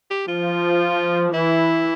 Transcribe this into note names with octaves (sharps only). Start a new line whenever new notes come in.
G4
F3 F4
E3 E4